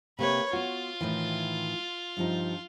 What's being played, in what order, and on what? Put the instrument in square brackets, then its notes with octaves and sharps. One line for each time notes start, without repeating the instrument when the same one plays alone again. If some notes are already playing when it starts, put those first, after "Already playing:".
[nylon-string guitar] C3 A#3 [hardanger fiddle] B4 C#5
[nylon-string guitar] B3 F#4 [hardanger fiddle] F4
[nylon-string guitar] A2 D#3 E3
G2 F3 D#4